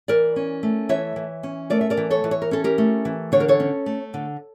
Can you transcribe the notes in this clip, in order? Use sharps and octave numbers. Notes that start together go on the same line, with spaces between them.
E3 A#4 D5
C#4
A3
E3 C#5 E5
E3
C#4
A3 A#4 D5
E5
A#4 D5
E3
A4 C#5
E3
C#5
A#4
C#4 A4
G4 A#4
A3
E3
D3 C#5
A#4
A4 C#5
C#4
A3
D3